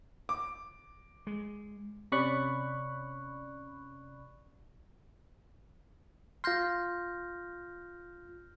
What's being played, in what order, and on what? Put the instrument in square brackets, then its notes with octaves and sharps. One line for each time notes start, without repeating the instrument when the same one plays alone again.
[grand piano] D6
[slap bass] G#3
[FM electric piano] C3 C#4 D5 B5 C#6 F#6
[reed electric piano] F4 C6 [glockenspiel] F6 G6 A#6